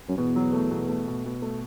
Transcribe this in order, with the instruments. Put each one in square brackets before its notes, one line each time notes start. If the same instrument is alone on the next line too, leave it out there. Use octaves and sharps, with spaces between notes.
[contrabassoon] F#2
[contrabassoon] E2 [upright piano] B2
[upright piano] F#3
A3
B2
A3
B2
B2
A3